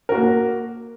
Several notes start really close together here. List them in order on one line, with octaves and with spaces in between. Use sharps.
A#4 F#4 A#3